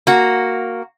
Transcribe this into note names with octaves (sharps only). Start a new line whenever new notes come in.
A#3 F#4